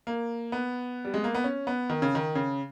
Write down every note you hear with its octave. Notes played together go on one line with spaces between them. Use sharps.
A#3
B3
G3
G#3
A#3
B3
C#4
B3
D#3
C#3
D#3
C#3